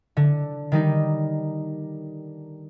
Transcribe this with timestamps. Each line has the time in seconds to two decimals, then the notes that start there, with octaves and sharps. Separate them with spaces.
0.17 D3
0.72 D#3 G3 D#4